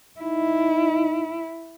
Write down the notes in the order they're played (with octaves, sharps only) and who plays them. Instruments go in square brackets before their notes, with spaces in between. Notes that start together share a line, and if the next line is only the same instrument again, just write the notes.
[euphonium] D#4 [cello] E4